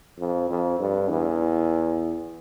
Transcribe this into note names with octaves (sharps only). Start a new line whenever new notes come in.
F2
F2
G2
E2